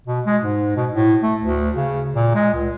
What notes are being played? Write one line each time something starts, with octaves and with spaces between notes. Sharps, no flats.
B2
G#3
G#2
B2
A2
A3
D2
C#3
A#2
G#3
C#2